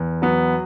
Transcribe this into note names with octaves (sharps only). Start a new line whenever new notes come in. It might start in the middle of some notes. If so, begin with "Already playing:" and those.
Already playing: E2
F#3 B3